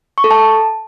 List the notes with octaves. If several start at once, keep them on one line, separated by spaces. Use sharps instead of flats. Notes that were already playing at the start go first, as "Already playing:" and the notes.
C#6
A4
A5